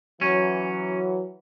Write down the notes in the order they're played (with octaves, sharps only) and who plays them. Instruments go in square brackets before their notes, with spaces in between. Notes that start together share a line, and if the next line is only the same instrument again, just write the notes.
[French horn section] E3 F#3 [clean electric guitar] C#4